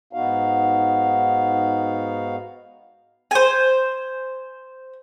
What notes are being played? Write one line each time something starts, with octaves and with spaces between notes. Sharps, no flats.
G#2 B3 D#4 F#4 F5
C5 G#5